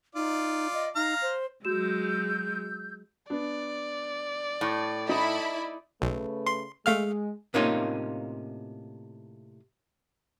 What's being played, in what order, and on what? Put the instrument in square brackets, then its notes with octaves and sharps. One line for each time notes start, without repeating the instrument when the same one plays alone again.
[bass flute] D#4 [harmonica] F4 D5
[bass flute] D#5
[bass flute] D#4 [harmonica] F5 A#5 F6
[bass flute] C5
[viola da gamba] F#3 G#3 [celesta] F#4 E7 [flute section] E6 G6
[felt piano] B3 D4 [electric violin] D5
[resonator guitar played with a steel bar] A2
[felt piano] D#4 [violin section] E4 B5
[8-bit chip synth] B1 [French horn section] C#3 A3 B4
[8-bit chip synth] C6
[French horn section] G#3 [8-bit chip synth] A3 F5 F6
[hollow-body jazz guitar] A2 C3 A#3 C#4 D#4 F4